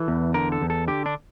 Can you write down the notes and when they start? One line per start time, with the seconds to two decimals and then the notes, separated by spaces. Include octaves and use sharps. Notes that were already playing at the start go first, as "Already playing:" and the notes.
Already playing: E3 A4
0.08 E2
0.34 D3 A#4
0.52 A4
0.61 E2
0.70 A4
0.88 D3 G4
1.06 D4